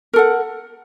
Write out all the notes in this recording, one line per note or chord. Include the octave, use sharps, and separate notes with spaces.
A4 A#4 F#5